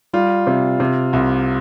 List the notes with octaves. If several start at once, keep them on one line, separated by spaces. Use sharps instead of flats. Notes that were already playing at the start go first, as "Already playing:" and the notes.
G3 F4
C3
C3
C2